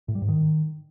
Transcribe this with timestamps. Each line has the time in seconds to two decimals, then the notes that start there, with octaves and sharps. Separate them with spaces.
0.08 A2
0.15 G3
0.22 G#2
0.28 D#3